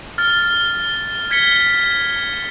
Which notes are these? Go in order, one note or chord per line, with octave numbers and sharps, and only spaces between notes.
F6 A6
G#6 B6 C#7 G7